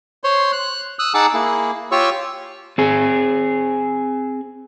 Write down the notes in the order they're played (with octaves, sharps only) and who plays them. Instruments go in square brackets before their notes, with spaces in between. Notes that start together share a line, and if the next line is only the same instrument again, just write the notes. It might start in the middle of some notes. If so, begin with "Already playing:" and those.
[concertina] C5 C#5 C6
F#6
D#6 E6 F#6
D#4 G#4 F#5 A5 D6 E6
A#3 E4 G#4
F4 G4 C#5 C#6 E6
[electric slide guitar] C4 G#4